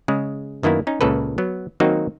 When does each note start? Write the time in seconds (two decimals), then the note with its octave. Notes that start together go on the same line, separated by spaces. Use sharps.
0.08 C#3 G#3
0.63 F#2 D#3 A#3 B3 E4
0.87 C#4 D#4
1.01 C#2 A#2 C#3 A4 B4
1.38 F#3 B3
1.80 D#3 F#3 A#3 C4 D#4 F#4